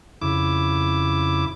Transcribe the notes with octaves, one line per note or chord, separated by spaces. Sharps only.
F2 C#3 E4 D6